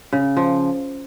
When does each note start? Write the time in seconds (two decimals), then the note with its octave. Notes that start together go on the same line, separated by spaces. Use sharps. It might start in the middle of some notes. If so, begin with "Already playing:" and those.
0.13 C#3
0.37 F3